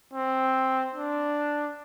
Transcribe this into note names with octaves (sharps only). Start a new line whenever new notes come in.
C4
D4